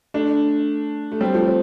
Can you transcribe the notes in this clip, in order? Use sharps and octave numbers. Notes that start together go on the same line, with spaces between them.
A3 D4
A3
G3 C4
F3 A3
C4